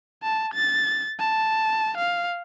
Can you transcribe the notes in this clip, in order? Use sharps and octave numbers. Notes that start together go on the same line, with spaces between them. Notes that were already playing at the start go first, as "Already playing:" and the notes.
A5
A6
A5
F5